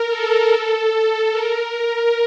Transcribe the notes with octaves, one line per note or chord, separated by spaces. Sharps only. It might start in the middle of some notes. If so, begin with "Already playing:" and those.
Already playing: A#4
A4
A#4